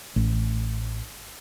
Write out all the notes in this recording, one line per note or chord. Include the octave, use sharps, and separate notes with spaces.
A1